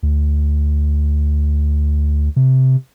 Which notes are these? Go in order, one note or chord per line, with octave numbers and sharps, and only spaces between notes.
D2
C3